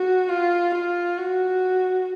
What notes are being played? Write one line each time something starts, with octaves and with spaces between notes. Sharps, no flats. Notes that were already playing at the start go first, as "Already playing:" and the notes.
Already playing: F#4
F4
F4
F#4